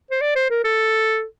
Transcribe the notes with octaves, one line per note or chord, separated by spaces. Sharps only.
C5
D5
C5
A#4
A4